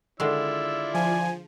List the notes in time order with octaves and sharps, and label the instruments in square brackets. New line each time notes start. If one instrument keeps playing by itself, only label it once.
[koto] D3 D#3 G#3 [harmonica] E4 F4 D5 [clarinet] E6
[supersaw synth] F3 [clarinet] G#5